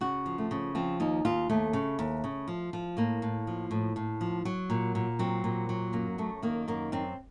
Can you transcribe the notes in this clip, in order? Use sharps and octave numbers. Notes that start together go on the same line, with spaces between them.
C#3 F#4
F3
A3
C#3
F3 C4
D#2 D#4
D#2 F4
D#2 A3
C#3
D#2
C#3
F3
F3
A2 A#3
A2
F3
A2
A2
F3
F#3
A#2
A#2
F#3 C4
A#2
F#3
F#2 A#3
F#2 A3
D#3 A#3
F#2 A#3
F#2 C4